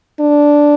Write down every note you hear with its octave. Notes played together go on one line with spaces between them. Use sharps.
D4